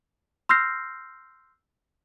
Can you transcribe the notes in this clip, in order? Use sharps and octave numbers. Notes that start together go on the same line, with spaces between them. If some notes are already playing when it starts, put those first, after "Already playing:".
C6 E6 F6 G6 A#6 C7